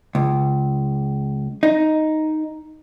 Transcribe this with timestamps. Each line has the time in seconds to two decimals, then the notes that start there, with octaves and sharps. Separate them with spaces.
0.15 C#2
1.63 D#4